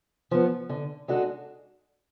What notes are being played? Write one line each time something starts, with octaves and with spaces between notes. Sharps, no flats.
F3 B3
D3
G#3 D4 F#4 A4